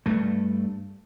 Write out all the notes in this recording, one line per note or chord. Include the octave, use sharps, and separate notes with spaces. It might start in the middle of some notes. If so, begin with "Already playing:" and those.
G2 A3